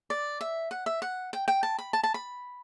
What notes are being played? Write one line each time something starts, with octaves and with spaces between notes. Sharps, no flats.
D5
E5
F#5
E5
F#5
G5
G5
A5
B5
A5
A5
B5